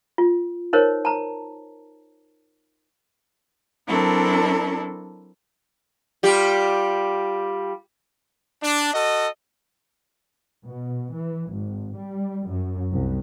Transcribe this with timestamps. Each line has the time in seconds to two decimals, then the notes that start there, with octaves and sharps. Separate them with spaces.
0.18 F4
0.73 D#4 A#4 C5 C#5
1.05 A5 A#5
3.86 F#3 C4 D4 E4 A4 A#4
6.23 G3 F4 G4
8.63 D4
8.93 F#4 A4 D#5
10.65 B2
11.13 E3
11.51 G#1
11.97 G3
12.48 F#2
12.92 C2